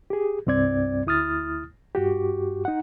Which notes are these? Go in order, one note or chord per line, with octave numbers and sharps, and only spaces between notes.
G4 G#4
C2 G2 C4 D5 G#6
D2 E4 D#6 F6 A6
G2 F#4 G4
D#4 F#5